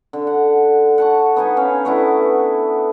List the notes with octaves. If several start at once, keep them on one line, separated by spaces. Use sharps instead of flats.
D3
F#5
F#5 A5 C#6
B3 D#4 G#5
C#4 F5
A3 B3 D4 E4